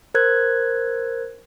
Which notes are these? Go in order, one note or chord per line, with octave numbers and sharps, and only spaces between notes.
A#4 C5 F#6 G#6